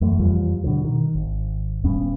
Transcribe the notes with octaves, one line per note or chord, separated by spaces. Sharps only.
F#2 E3 A3
F2 E3 F3 G3
G2 B2 D3 F3
D#3
G#1
D#1 G2 B3 C#4